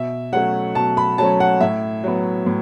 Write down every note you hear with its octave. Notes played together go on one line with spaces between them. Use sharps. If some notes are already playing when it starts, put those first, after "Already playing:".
Already playing: B2 E5
F#3 A3 C#4 F#5
B2 A5
B5
F#3 A3 C#4 A5
F#5
A2 E5
F#3 B3
A2